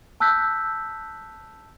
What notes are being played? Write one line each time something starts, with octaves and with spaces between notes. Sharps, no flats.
A5 E6 F#6 G6 B6